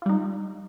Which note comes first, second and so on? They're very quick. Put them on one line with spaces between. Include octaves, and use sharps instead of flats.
F4 G3 D#4